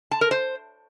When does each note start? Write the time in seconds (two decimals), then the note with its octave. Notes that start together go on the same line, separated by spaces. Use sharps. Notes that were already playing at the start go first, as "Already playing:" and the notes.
0.11 A5
0.21 A#4
0.31 C5